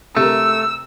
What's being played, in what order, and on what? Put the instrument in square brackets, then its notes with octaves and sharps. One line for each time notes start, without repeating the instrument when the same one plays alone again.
[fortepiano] C3 A#4 [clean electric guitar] A3 [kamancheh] E6